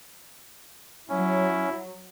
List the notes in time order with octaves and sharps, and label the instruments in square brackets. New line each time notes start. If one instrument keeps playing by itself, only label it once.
[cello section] F#3 [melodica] C#4 [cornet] E4